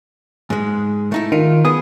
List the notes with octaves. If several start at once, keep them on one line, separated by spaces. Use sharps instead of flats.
G#2 G#3
A3 D#4 E4
D#3 F4
B3 G#4 D#6